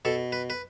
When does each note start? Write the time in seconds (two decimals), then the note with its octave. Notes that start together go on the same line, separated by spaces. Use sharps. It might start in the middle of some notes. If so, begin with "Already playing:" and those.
0.05 B2 A4
0.32 B4
0.50 B4